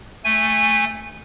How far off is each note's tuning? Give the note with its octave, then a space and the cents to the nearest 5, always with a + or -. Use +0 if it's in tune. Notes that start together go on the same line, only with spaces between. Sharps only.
A3 +0 G#5 -20